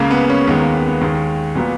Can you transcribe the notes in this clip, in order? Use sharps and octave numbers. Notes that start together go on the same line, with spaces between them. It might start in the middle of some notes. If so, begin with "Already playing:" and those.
Already playing: C#2 C#3 G#3 A#3
B3
C#4
D#2 D#3 G#3 B3
A#3
B3
B3
D#2 D#3 G#3
A#2 F#3 A#3 B3